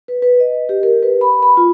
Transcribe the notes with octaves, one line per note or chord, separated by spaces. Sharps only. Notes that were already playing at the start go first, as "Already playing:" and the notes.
B4
B4
D#5
G4
A#4
B4
B5
B5
F4